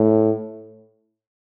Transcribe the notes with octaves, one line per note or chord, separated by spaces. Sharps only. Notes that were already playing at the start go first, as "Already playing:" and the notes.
Already playing: A2